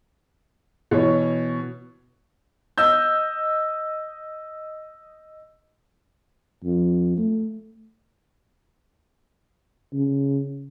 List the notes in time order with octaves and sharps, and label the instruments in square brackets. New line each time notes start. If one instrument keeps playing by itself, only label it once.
[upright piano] B2 E3 C#5
D#5 E6 G6
[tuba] F2
A3
C#3